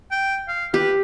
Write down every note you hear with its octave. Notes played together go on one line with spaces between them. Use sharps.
G5
F5
G4 B4